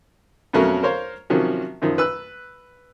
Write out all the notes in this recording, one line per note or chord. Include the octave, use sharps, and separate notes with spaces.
F2 B2 F#3 A3 C#4 A#4
A#4 C5 C#5 F5
C3 D#3 F3 F#3 C#4
F#2 D#3 F3
B4 E6 F#6